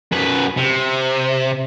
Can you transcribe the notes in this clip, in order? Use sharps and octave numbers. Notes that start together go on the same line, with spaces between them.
F#2 B4
C3